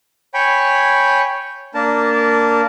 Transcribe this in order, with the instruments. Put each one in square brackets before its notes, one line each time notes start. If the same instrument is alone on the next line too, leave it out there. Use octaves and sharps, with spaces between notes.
[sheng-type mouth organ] C#5 G5 G#5 B5 C#6
A#3 D4 A#4 A5